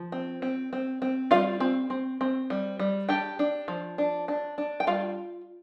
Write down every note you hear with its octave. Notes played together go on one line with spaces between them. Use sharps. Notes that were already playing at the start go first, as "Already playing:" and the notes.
Already playing: F3
C4
C4
C4
C4
G3 F4 F5
C4
C4
C4
G3
G3
D4 G4 G5
D4
F3
D4
D4
D4
G5
G3 F4 F5